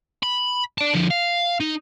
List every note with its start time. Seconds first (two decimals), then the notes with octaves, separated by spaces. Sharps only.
0.23 B5
0.78 D5 A5
0.93 D3 F3
1.11 F5
1.60 D#4